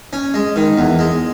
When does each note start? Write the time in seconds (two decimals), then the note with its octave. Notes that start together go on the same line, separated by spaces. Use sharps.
0.13 C#4
0.34 G#3
0.56 D#3
0.77 E2
0.99 G#3